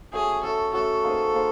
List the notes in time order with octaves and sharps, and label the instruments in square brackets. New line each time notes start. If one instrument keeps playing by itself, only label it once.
[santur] A3 C#4 F#4 [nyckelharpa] G#4
[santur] A3 C#4 F#4 [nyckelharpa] A4
[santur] A3 C#4 F#4 [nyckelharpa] A4
[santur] A#3 D#4 G#4 C5
A#3 D#4 G#4 C5